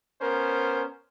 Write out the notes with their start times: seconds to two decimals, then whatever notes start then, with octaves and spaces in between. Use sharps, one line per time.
0.22 B3 C#4 A#4 C5